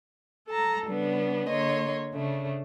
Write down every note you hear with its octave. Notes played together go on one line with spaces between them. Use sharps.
A4 A5 A#5
C#3 G3 B3 D4
D3 A#3 C#5 D#5 C6
C#3 A3 D4